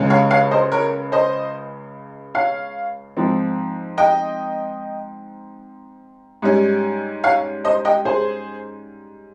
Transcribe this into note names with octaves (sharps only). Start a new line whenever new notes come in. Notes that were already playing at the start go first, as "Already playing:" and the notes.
Already playing: C#2 C#3 G#3 C#4
C#5 F5
C#5 F5
C5 D#5
A#4 C#5
C5 D#5
C#5 F5
G#2 F3 C4
D#5 G5
G#2 G3 C#4
C#5 F5
C5 D#5
D#5 G5
G#4 C5